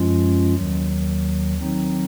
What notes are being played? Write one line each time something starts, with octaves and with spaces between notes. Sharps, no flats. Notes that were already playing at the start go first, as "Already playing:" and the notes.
Already playing: F#2 F3 G#3 C#4 F4
D#2 D#3 F#3
D#3 F#3 C4 D#4